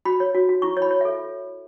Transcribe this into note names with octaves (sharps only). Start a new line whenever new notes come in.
F#4 B5
C#5
F#4
F#4
E4 C#6
C#5
B5
C#5
A4 E5